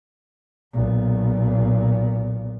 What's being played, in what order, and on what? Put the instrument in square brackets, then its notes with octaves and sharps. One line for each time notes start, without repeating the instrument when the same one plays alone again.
[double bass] B1 A#2